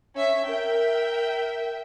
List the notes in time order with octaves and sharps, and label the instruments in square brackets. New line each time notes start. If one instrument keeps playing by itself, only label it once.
[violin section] C#4 E5
[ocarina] A#4 [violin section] E5 G5